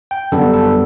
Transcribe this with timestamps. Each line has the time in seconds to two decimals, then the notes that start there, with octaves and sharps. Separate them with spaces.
0.11 G5
0.32 F#2 D3 G3 B3 A4
0.53 A4